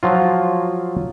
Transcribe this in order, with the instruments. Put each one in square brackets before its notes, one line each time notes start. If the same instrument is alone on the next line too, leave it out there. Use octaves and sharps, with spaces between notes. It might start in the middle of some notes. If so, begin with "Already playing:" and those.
[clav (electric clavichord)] F3 F#3 F4